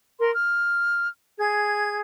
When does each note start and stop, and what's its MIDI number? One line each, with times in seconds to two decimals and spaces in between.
0.19 0.31 70
0.19 0.31 84
0.34 1.08 89
1.39 1.99 68
1.39 1.99 92